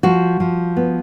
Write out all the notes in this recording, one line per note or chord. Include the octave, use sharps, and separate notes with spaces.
F3 F#4
F3
B3